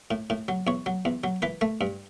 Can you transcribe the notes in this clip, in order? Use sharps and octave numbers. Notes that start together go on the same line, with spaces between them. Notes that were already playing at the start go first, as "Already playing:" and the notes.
A2
A2
F#3
E2 C#5
F#3
E2
F#3
E3 B4
A3
G2